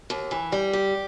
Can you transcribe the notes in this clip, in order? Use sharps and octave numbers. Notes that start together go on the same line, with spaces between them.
D#2
E3
G3
G4